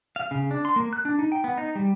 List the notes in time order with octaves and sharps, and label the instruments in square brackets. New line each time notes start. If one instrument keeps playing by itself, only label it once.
[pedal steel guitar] F5
C#3
D4
C6
A#3
F#6
D4
D#4
G5
B3
D#4
G3